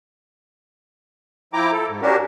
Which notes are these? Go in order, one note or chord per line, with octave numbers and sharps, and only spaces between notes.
F3 E4 G5 A#5 D6
A4
G#2
C#4 D4 F#4 G4 A#4